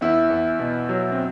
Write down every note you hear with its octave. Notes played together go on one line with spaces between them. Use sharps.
E2 E4
E2
B2
F#3
C4